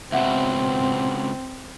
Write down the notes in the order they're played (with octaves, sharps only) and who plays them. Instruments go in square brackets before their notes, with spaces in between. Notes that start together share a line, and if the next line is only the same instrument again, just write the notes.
[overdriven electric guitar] C#2 B2 [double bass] C4 [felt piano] E5 F#5